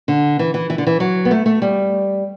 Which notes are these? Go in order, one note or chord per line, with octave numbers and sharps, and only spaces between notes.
D3
E3
E3
E3
D3
E3
F#3
B3
A3
A3
G3